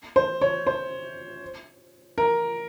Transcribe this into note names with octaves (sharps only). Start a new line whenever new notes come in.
C5
C#5
C5
A#4